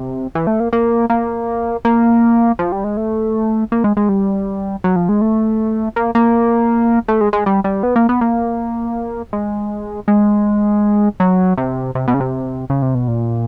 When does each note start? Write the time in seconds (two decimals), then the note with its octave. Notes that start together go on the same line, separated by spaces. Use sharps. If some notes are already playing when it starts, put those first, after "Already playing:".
Already playing: C3
0.35 E3
0.47 A3
0.60 A#3
0.73 A#3
1.10 A#3
1.85 A#3
2.59 F3
2.72 G3
2.84 G#3
2.97 A3
3.72 A#3
3.84 G#3
3.97 G#3
4.09 G3
4.84 F#3
4.96 F3
5.09 G#3
5.21 A3
5.96 A#3
6.15 A#3
7.08 A3
7.21 G#3
7.33 G#3
7.46 G3
7.64 G3
7.83 B3
7.96 A#3
8.09 B3
8.21 A#3
9.33 G#3
10.08 G#3
11.20 F#3
11.58 C3
11.95 C3
12.08 B2
12.14 C#3
12.20 C3
12.70 C#3
12.82 C3
12.95 B2
13.08 A#2